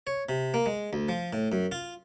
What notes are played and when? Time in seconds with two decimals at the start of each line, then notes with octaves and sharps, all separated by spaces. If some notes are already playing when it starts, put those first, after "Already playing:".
0.07 C#5
0.29 C3
0.54 A#3
0.66 G#3
0.93 D2
1.09 F3
1.33 A2
1.52 F#2
1.72 F4